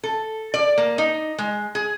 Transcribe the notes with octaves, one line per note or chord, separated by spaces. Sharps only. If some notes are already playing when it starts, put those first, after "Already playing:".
A4
D5
A#3
D#4
G#3
G#4